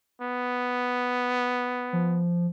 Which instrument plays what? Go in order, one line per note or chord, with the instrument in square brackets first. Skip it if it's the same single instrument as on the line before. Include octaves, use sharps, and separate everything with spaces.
[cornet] B3
[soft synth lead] F3